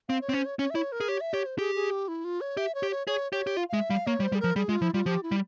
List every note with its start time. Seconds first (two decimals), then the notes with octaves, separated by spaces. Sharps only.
0.09 C4 F5
0.21 C#5
0.29 C4
0.33 C#4 C5
0.46 C#5
0.59 C#4 C#5
0.70 E5
0.75 E4 C#5
0.92 A#4
1.00 G#4
1.09 G4 C#5
1.21 E5
1.34 G4 C#5
1.46 C5
1.58 G4 G#4
1.75 G#4
1.92 G4
2.08 E4
2.25 F4
2.41 C#5
2.57 G4 E5
2.75 C#5
2.83 G4
2.91 C#5
3.07 G#4 C#5
3.32 G4 C#5
3.47 G4
3.57 F4 F5
3.69 F5
3.73 G#3 E5
3.90 G3 F5
4.07 A#3 C#5
4.20 G3
4.23 C5
4.32 G3
4.35 G#4
4.40 F3 A#4
4.56 G3 G#4
4.69 G#3 F4
4.81 F3 E4
4.94 G3 F4
5.06 F3 G4
5.23 E4
5.32 G3